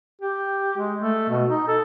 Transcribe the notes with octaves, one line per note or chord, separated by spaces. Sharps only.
G4
G#3
A3
B2
D#4
A4